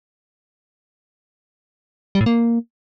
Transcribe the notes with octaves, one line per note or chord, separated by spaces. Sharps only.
G3
A2
A#3